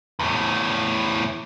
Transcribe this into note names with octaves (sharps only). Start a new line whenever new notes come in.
E2 A2